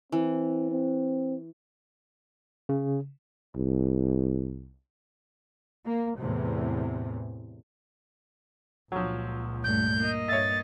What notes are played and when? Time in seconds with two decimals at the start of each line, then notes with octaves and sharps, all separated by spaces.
0.12 E3 C4
0.71 C4
2.69 C#3
3.56 C2
5.85 A#3
6.18 E2 A2 C3
8.92 C#2 A#2 F3 F#3
9.64 G2 A3 G6
9.97 A#3 D#5
10.28 G2 C#5 E5 A6